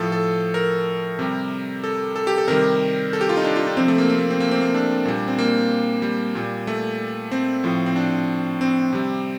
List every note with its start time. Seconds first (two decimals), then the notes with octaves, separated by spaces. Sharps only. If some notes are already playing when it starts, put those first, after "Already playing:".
Already playing: A2 F3 A4
0.12 A4
0.54 A#4
1.19 C3 G3
1.84 A4
2.16 A4
2.27 G4
2.38 A4
2.48 C3 D#3 G3 A#4
3.13 A4
3.21 G4
3.29 F4
3.37 D#4
3.44 D4
3.56 F4
3.67 D4
3.77 C3 F3 C4
3.88 A3
3.98 A#3
4.10 C4
4.19 A#3
4.30 C4
4.40 A#3
4.51 C4
4.62 A#3
4.74 D4
5.05 A#2 G3
5.28 C4
5.38 A#3
6.02 G3
6.35 A#2 G3
6.67 A3
7.31 C4
7.64 A2 F3
7.86 C4
7.96 D4
8.61 C4
8.93 C3 G3